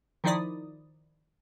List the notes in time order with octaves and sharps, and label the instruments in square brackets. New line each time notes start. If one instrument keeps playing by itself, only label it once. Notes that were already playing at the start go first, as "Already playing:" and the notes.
[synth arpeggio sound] D#3 F3 D#4 E4 D5 D#6